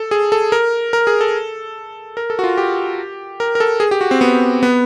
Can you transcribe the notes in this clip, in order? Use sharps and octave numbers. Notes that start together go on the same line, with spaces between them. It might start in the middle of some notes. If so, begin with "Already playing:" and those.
Already playing: A4
G#4
A4
A#4
A#4
G#4
A4
A#4
A4
F#4
F4
G4
A#4
A#4
A4
G#4
G4
F#4
C4
B3
B3